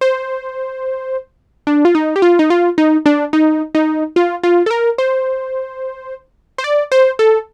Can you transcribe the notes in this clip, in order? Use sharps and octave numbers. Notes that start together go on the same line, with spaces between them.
C5
D4
F4
D#4
G4
F4
D#4
F4
D#4
D4
D#4
D#4
F4
F4
A4
A#4
C5
C5
D5
C5
A4